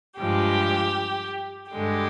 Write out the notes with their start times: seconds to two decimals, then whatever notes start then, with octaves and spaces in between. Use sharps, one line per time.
0.19 G2 F3 G#3 G4
1.72 G2 D3 G#3 G4